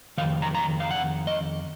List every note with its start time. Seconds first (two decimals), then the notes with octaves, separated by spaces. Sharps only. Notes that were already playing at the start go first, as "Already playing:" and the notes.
0.18 F2 D#3 F5
0.42 A#5
0.55 A#5
0.80 F5
0.91 F#5
1.27 D#5